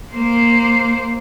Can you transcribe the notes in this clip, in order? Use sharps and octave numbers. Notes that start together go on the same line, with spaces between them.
A#3 C5